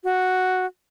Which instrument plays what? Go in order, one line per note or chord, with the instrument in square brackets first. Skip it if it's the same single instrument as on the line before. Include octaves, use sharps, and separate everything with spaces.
[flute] F#4